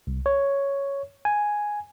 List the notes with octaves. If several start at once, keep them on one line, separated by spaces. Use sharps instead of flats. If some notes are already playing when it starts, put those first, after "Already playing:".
C2
C#5
G#5